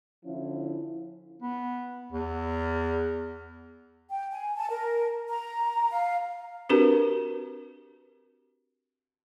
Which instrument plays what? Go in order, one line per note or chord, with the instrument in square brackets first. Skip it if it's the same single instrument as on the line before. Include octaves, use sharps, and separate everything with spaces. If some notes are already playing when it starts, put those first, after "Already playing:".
[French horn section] D3 F3 C#4 E4
[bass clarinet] B3
E2
[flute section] G5
G#5
A5
A#4
A#5
F5
[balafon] C4 D4 F#4 G4 A#4 B4